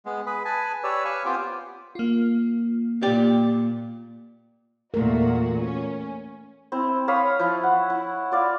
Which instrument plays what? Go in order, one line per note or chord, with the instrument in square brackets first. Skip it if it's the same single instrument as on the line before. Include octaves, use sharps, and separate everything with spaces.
[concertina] G#3 B3
G#4 B4 B5
B4 G#5 A5 B5
G4 B4 C#5 D5 E6
C#5 F5 G#5 B5 C#6
B3 C4 F4 G4 C5 G5
[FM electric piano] A#3 F4
[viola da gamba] A#2 [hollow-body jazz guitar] G4 D5
[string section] E2 A#2 F#4 [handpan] A3 A#4
[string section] C#4
[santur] C4 E4
C#5 F5 B5 D#6
F3 E4
F#5
E4
F4 D5 F5